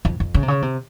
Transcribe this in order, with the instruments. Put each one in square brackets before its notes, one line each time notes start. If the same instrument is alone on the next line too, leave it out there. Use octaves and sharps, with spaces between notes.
[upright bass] F2
F2
C#3
C3
C#3
C3